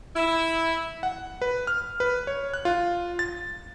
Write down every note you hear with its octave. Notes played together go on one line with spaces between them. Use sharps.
E4
F#5
B4
F6
B4
C#5
F#6
F4
A6